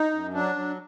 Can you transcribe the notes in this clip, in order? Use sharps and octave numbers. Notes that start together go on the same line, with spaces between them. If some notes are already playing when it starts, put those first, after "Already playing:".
Already playing: D#4
F#2
F#3 D4
F#3